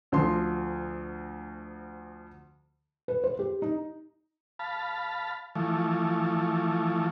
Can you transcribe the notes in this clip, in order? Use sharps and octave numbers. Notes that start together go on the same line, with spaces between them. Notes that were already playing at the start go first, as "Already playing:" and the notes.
D2 F3 C6
B4
C5
G4
D#4
F5 A5 B5
E3 F3 A3